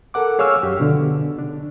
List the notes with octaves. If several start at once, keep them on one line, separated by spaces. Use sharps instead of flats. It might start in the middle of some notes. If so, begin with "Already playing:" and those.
A4 A#4 F#5 D6
G#4 C#5 F5 C#6 E6 F6
F#2 G4
B2 D3
D4